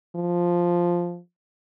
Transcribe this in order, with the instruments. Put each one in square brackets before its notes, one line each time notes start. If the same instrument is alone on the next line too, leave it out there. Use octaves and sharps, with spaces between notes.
[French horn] F3